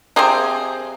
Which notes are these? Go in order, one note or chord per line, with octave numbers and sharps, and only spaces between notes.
C3 F3 C4 G#4